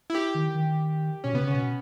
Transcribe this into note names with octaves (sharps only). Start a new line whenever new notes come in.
E4
G4
D#3
D#3
B2 C#4
C#3 B3
C#3 C#4
B2 B3